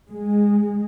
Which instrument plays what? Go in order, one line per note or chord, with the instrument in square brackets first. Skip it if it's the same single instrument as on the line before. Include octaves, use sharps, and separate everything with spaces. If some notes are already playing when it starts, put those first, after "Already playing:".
[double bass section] G#3